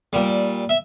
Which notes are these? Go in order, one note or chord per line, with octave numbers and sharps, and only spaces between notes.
A#2 G3
E5